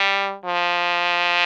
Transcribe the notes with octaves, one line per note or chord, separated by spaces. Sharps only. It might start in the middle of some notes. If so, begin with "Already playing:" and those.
Already playing: G3
F3